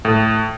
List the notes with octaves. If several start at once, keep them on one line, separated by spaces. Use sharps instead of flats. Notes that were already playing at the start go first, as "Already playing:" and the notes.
A2